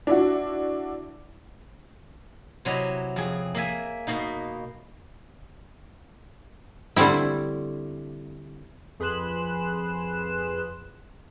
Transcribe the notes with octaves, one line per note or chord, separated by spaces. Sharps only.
D4 E4 F#4
C3 F#3 E4 D#5 A#5
F2 G#4
A#3 E5 G#5
B2 A#3 D#4
D3 G3 A3 C4 E4
F2 G#4 B4 C6 F#6 E7